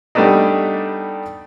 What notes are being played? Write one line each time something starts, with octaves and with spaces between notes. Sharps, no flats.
G3 A3 B3 D4 D#4